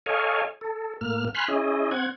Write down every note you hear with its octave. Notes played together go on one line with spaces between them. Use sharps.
A4 C#5 D#5 F5 G#5
A4
A2 A#3 F6
G#5 B5 C6 F6 F#6
C#4 E4 G#4 D#5
C4 F#5 G#6